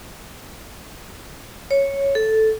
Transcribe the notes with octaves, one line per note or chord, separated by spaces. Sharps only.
C#5
A4